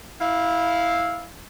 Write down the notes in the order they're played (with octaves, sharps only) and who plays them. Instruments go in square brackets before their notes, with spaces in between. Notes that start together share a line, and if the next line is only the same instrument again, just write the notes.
[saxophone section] E4 F5